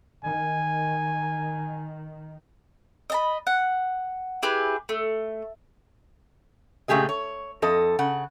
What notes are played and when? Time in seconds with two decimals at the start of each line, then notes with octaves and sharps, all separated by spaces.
0.24 D#3 G#5
3.10 D#5 A5 B5
3.47 F#5
4.43 E4 G4 G#4 B4
4.89 A3
6.88 A#2 C#3 A3 G4 G#4 D#5
7.09 C#5
7.62 F2 A4 D#5
7.99 C#3 F#5